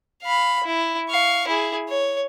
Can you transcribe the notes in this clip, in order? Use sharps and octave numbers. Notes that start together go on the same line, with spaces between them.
F5 B5
E4
F5 C#6
E4 G#4
C#5